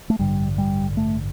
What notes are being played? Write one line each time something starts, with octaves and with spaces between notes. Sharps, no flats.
A3
A1 G2 D3 G3
G3
A3